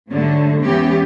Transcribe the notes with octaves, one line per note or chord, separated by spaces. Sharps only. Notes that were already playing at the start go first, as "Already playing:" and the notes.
G#2 D3 F#3 G3 A3
E2 E3 G#3 B3 C#4 G4